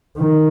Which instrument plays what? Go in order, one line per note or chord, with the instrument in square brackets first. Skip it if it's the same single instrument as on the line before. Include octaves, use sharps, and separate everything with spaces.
[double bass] D#3